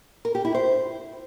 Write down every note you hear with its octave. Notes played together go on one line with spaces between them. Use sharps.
A#4
G4
E4
C5